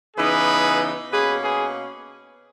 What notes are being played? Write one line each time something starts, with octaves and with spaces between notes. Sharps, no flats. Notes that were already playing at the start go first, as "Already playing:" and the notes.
C#3 E3 B3 D#4 G#4 B4
B2 A#3 C#4 G#4 B4
G#4 B4